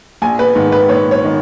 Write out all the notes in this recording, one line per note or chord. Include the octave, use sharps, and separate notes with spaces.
A#1 G#5
B4
G#2 D#3
B4
A#1 C#5
C#5
D#3